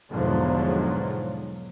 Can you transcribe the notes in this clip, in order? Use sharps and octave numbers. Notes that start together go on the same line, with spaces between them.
B1 E2 G#2 D3 F3 F#3